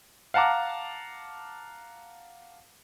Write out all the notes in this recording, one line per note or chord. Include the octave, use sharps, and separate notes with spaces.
F5 F#5 A5 A#5 D6